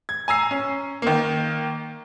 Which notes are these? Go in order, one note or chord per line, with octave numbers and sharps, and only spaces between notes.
G#6
G#5 A#5 E6 C7
C#4
D#3 A#3